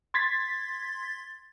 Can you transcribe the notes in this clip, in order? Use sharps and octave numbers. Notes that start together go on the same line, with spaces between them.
C6 G#6 A6 B6